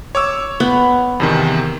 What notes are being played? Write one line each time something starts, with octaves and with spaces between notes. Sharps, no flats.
C#5 D6 E6
B3
E2 C3 D#3